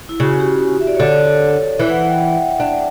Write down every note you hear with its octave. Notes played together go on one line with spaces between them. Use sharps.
E4
C#3 F#4
G4
E5
D5
C#5
D3 D5
E3 E5
F#5
F#5
G5
D4